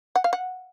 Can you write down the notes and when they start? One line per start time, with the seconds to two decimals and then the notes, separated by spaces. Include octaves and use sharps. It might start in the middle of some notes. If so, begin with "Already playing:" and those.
0.16 F#5
0.24 F5
0.33 F#5